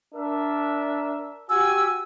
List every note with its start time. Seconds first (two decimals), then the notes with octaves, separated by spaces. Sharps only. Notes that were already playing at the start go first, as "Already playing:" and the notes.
0.14 D4 A#4 E5
1.50 F#4 G4 G#5 E6